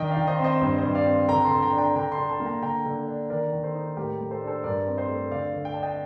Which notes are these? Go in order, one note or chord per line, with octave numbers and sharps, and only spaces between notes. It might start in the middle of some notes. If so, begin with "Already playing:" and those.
Already playing: D#3 D4 D#5 G5
D5 F5
D#3
C5 D#5
C4
C5 D#5
G2 C5 D#5
C5 D#5
G2
D5 F5
C4
D3 G5 A#5
A5 C6
D3
G5 A#5
D4
G5 A#5
D3 G5 A#5
A5 C6
D3
A5 C6
A#3
G5 A#5
D3 G5 A#5
D3
D4
D#3 A#4 D5
D#3
A4 C5
D#4
A2 G4 A#4
A2
A4 C5
D4
A4 C5
G2 A#4 D5
C4
C5 D#5
A3
D3 D5 F5
D3
G5
D4 A5
D#5 G5